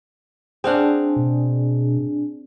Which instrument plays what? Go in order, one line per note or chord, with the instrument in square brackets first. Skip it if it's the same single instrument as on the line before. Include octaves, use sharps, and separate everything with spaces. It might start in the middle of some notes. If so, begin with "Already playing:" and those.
[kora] C4 F5 F#5 [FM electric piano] D4 G#4
[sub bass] B2